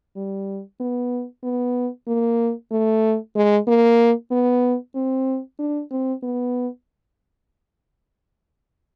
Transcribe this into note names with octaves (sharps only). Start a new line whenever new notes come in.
G3
B3
B3
A#3
A3
G#3
A#3
B3
C4
D4
C4
B3